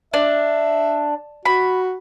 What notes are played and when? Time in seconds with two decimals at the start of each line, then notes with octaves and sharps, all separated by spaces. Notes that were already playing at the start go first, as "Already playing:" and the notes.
0.14 D4 E5
1.45 F#4 B5